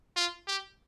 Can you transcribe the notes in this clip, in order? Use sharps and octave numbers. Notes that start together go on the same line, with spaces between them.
F4
G4